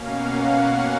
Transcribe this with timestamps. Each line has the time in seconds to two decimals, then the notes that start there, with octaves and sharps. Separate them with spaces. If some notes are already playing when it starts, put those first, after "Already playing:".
Already playing: B2 A#3 C#4 F5
0.09 F#5